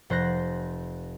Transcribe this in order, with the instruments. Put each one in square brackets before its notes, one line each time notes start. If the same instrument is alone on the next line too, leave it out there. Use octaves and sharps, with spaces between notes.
[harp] F1 C5 F#6 A#6